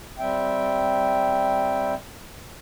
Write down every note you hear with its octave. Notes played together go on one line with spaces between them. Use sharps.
G3 C4 E5 G5